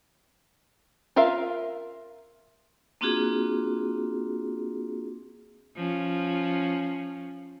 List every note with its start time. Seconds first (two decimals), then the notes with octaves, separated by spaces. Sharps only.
1.16 F4 A#4 E5 F5
3.01 A#3 C4 D4 F4 F#4 G#4
5.76 F3 C#4